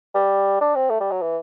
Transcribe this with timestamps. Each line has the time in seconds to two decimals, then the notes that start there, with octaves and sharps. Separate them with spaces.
0.15 G3
0.61 D4
0.75 C4
0.90 A3
1.00 G3
1.12 F#3
1.22 E3